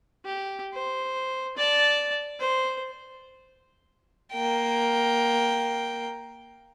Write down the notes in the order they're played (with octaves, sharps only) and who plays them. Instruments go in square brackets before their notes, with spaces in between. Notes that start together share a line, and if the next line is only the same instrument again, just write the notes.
[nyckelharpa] G4
C5
D5 A5
C5
[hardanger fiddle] A#3 G5